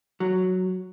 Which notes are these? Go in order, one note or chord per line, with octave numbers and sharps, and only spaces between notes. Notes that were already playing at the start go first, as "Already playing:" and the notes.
F#3